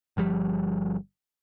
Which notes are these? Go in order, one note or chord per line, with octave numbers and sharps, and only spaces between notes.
G1 F3 G3